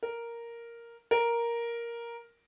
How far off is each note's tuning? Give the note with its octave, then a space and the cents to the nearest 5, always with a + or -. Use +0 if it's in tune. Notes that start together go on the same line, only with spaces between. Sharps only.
A#4 +0
A#4 +5